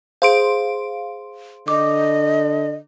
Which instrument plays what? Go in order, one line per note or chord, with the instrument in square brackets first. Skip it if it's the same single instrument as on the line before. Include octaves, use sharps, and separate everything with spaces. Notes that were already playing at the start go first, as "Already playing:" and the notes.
[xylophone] G#4 C5 [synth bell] F5 C6 D7
[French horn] D3 [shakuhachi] D#5 [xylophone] D6